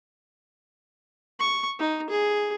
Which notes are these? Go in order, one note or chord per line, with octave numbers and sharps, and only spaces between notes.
C#6
D#4
G#4